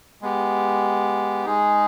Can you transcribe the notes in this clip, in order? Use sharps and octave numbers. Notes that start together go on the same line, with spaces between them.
G#3 B3 G4
G#3 D#4 G#4